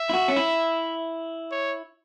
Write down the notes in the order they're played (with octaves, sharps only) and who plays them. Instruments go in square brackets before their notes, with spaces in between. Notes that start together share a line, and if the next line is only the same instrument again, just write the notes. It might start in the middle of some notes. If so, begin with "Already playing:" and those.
Already playing: [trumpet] E5
[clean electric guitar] E4
F#4
C#4
E4
[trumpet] C#5